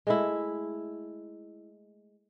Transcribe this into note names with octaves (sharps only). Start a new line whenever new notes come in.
G#3 A3 E4